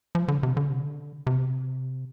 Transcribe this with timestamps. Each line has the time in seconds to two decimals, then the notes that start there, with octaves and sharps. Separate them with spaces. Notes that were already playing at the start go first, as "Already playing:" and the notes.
0.15 F3
0.28 D3
0.43 C3
0.57 D3
0.69 C3
0.80 D3
1.27 C3